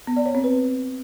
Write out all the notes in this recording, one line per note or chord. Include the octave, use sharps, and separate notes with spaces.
B3
D5
C#5
C4
B4